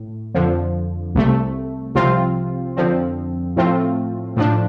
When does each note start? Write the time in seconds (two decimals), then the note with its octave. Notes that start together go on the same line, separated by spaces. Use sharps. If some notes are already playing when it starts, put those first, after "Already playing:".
Already playing: A2
0.35 F2 D3 F3
1.15 C2 C3 A3
1.95 C2 C3 F3 C4 F4
2.77 F2 D3 F3 C4
3.56 A2 F3 A3 C4 F4
4.37 A2 F3 D4